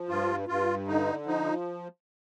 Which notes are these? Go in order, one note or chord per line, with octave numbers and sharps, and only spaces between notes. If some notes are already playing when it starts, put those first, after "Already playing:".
Already playing: F3
G2 F4
G2 F4
D3 D#4
F3 D#4